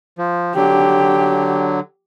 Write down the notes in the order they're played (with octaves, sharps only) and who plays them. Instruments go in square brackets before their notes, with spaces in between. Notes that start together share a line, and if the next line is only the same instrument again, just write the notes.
[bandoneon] F3
[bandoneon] D3 F#3 [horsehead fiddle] G4